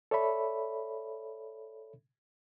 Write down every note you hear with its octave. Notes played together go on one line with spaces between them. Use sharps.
A4 C#5 D5 E5 B5